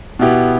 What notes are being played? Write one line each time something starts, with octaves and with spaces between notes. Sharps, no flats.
B2 B3 E4 G4